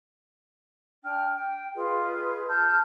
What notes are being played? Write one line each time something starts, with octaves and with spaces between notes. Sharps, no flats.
D4 G5 F6
G5
F4 G#4 B4 D#5
A5 F6 G6